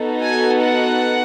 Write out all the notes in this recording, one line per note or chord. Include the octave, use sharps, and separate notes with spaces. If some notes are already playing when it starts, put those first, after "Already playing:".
Already playing: B3 D#4 F#4 A4
G#5
F#5